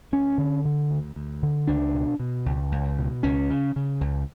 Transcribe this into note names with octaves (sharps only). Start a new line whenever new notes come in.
D2 C#4
D3
D3
D2
D2
D3
C#2 D4
B2
B2
C#2
C#2
B2
C#2 C#4
C#3
C#3
C#2